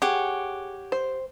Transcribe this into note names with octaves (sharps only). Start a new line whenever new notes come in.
G4 G#4 C#5 F#5
C5